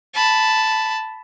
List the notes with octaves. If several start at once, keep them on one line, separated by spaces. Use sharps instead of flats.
A5 B5